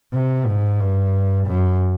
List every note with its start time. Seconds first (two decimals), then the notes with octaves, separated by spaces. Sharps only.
0.13 C3
0.46 G#2
0.80 G2
1.46 F#2